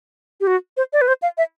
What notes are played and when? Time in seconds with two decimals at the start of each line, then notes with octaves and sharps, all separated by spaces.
0.41 G4
0.47 F#4
0.77 C5
0.93 D5
1.01 B4
1.08 C5
1.22 F5
1.38 E5